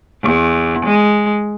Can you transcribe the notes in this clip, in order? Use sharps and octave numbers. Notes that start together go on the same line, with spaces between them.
E2
G#3